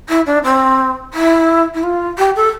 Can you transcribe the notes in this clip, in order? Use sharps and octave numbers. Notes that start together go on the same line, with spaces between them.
E4
D4
C4
E4
E4
F4
G4
A4